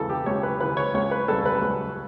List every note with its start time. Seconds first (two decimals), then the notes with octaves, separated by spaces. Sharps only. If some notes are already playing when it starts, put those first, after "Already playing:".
Already playing: C#2 C#3 E3 A4
0.10 G4
0.26 C#2 C#5
0.43 B4
0.60 C#3 E3 B4
0.77 C#5
0.94 C#2 C#5
1.11 B4
1.28 C#3 G3 A4
1.46 B4
1.62 C#2